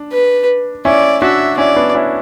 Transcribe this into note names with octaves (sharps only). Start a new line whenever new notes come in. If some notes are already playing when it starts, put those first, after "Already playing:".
Already playing: D4
B4
C#4 E4 D5
D4 F#4 E5
C#4 E4 D5
B3 D4
C#4 E4